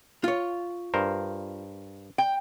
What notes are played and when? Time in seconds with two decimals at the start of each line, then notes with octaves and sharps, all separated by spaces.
0.24 F4 C#5
0.94 G2 A#4 C5
2.18 G5